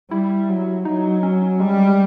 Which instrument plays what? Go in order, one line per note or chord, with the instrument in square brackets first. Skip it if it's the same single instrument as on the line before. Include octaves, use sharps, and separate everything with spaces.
[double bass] G3 [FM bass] E4
[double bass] F#3
[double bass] F#3 [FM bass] D#4
[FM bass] C#4
[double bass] G3 [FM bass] G#3